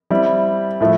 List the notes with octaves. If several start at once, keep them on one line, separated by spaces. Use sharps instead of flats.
G3 C4 E4
A2 F3 A3